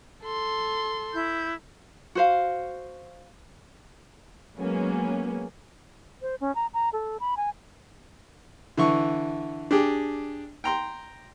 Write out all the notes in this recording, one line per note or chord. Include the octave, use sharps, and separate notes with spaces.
A4 C6
E4 G6
F#4 C5 F5
F#3 G#3 A#3 B3 C#4
C5
C#4
A#5
A#5
A4
B5
G#5
D3 E3 C#6
D4 G4 G#4
G5 A#5 C6